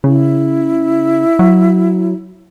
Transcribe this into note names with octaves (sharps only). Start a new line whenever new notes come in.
C#3 E4
F#3